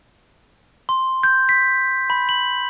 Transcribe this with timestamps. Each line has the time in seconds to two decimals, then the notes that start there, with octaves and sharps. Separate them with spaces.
0.89 C6
1.23 G6
1.49 B6
2.10 B5
2.29 F#7